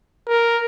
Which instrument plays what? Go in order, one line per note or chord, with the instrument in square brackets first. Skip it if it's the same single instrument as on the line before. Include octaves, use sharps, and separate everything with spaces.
[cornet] A#4